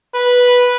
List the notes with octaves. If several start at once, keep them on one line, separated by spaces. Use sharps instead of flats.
B4